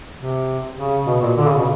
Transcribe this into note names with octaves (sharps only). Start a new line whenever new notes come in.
C3
C#3
B2
A#2
D3
C#3
B2